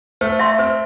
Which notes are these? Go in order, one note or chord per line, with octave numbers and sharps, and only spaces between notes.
A3 C5
E5 C6
C4 C5